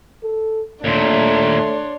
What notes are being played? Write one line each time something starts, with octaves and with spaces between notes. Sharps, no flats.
A4
D#2 A#2 A3 D4 C#5 C6